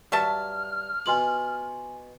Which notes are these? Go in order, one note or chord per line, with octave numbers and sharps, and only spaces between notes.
G2 F#3 E5 A5 F6
B2 F4 G#5 C6 D6 F#7